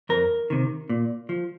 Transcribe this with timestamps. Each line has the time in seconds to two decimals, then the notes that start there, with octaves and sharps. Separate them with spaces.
0.09 F2 A#4
0.50 C3 D#3
0.89 A#2
1.29 F3